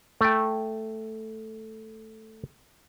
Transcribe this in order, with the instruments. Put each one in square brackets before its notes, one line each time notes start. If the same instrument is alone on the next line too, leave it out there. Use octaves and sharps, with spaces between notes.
[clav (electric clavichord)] A3 G5